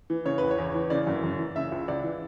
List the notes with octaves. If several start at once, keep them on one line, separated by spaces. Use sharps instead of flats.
E3
C#3 C#5
E2 B4
C#5
E2
E3
C#3 D5
F#2
F#2
E3
C#3 E5
C#2
C#2 D5
E3